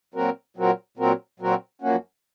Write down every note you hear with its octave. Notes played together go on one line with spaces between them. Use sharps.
A#2 F#3 C4 F#4 A#4
A#2 F#3 C4 F#4 A#4
A#2 F#3 C4 F#4 A#4
A#2 F#3 C4 F#4 A#4
F#2 F3 A#3 C#4 F#4